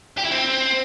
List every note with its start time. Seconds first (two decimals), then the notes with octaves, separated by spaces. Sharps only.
0.18 G4
0.25 E4
0.31 C4